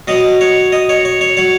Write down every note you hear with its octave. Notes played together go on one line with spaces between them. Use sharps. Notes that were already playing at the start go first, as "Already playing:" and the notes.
B2 F#3 D#5
C#5
D#5
C#5
C#5
C#5
F#3 C#5